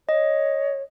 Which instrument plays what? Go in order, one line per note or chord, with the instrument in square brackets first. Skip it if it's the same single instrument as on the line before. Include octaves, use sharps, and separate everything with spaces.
[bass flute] C#5 [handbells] D#5